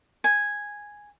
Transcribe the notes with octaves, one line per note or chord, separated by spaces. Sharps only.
G#5